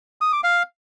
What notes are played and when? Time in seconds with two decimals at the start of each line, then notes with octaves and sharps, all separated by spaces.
0.21 D#6
0.32 D6
0.44 F5